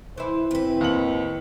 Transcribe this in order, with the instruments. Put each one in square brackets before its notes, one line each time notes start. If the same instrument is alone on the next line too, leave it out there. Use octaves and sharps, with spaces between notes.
[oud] E3 E4 [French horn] C5
[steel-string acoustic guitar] A2 B4 [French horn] C4
[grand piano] D#2 F#7